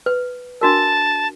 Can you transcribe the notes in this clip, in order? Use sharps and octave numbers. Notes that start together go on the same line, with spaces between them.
B4
D4 F#4 A#4 A5